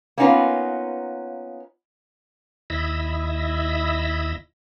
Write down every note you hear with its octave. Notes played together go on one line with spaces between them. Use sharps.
A#3 B3 C#4 D#4 F4 B4
D#2 E4 D#5 B5 E6 A#6